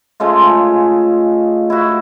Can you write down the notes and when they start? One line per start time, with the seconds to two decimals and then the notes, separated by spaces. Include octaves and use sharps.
0.20 C#3 G#3 A3 F4
1.70 E4 F#4